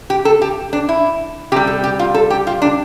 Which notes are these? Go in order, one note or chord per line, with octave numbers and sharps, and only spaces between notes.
G4
A4
G4
D4
E4
C3 G3 G4
A4
G4
F4
A4
G4
F4
D4